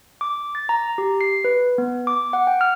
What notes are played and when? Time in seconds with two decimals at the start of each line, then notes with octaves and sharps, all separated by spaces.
0.21 D6
0.55 A6
0.69 A#5
0.98 G4
1.21 C7
1.44 B4
1.78 B3
2.07 D6
2.33 F#5
2.47 G5
2.61 F6